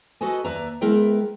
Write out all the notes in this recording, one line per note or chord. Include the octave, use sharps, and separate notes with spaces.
F#4 A4 B4 D#5 G#5
D#2 B4 D5 E5 A#5
G#3 B3 E4 A#4 B4 G5